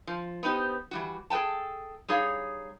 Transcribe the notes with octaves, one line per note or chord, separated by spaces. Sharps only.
F3
B3 C4 D#4 G4
E3 G3 F#4
G#4 A4 B4 G5 A5
G3 D#4 G#4 C#5 F5